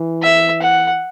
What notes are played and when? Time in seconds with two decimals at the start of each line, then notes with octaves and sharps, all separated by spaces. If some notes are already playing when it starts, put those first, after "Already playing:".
Already playing: E3
0.22 E5
0.62 F#5